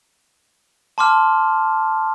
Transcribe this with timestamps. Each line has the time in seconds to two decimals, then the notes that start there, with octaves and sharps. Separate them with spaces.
0.98 A5 C6 D6 F6